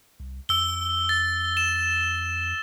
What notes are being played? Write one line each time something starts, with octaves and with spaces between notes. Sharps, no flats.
C2
F2 E6 G7
A6
E7